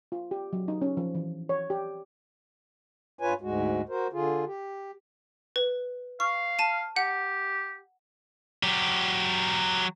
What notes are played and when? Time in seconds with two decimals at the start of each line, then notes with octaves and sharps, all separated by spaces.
0.12 F4
0.31 G4
0.53 F#3
0.68 D#4
0.82 C#4
0.97 F3
1.15 E3
1.49 C#5
1.70 G4
3.19 G2 F4 B4 C#5 G#5
3.41 D2 G#2 G#3 F#4
3.89 F#4 A#4 C5
4.13 D3 F4 G#4
4.47 G4
5.56 B4
6.20 F5 C#6
6.59 A5 D#7
6.96 G4 F#5
8.63 F#3 G4